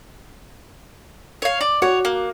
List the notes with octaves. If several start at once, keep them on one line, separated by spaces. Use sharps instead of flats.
C#5 F5
D5
F#4 C#5 F#5
A#3